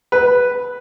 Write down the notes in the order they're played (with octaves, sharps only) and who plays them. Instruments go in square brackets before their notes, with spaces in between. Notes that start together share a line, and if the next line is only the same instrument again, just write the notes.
[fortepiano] B4